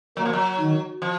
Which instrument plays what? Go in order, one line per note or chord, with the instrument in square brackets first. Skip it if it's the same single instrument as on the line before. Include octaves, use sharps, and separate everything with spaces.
[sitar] F#3 [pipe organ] A#3
[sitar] F3
F#3
[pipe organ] D#3
[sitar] F3